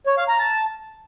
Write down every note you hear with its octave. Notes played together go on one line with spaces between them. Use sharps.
C#5
F5
A#5
A5